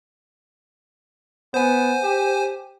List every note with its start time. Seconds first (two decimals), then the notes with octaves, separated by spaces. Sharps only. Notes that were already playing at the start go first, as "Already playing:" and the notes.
1.54 B3 C5 G#5
2.03 G4